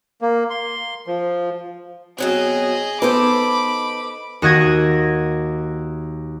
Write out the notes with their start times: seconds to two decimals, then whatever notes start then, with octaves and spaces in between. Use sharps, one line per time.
0.21 A#3
0.50 C6
1.07 F3
2.18 B2 F#3 C4 G#4 D#5
3.02 B3 D#4 A4 C5 B5 D6
4.42 D#2 F#4 D#5 F#6 G#6 A#6